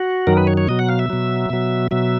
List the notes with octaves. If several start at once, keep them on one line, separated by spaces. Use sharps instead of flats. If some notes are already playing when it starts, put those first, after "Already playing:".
Already playing: F#4
F#2 D#3 F#3 A#4
B4
C#5
C#5
B2 F#3 D#5
F#5
F5
E5
B2 F#3
B2 F#3
B2 F#3 E5